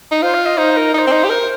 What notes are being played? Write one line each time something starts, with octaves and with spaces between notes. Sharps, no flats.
D#4
F4 C5
F5
D#5
D#4 C5
A#4
D#4 C5 D#5
C4
D#4
G4
A#4 C5